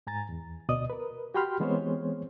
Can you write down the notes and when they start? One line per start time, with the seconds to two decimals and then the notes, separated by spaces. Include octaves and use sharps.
0.07 G#2 G#5 A#5 A6
0.29 E2
0.69 D2 B2 D5 D#5 D#6
0.90 A#4 B4
1.34 F#4 G4 G5 B5 C6 F6
1.60 E3 G#3 B3 C4 C5 C#5